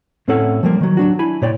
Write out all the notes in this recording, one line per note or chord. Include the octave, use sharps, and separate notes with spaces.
A2 C4 C#4 E4 A4 F#5
F3 G3 A#3
D#3 F#3
F#3 D4 F#4
D4 E4 G#5 B5
A#2 C#5 D5 G5